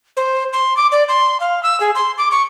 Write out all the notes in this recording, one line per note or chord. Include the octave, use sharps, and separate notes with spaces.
C5
C6
D6
D5
C6
F5
E6
G#4
C6
D6
C#6